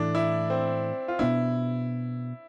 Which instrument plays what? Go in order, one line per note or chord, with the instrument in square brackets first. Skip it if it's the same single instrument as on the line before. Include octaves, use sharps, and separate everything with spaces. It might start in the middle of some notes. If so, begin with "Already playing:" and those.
Already playing: [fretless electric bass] A2 E3 A3 [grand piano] D4
[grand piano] E4
C4
F4
[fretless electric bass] B2 B3 D4 [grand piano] E4